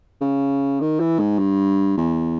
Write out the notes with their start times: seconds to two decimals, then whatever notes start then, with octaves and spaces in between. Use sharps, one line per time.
0.21 C#3
0.81 D#3
1.00 E3
1.19 G#2
1.39 G2
1.97 E2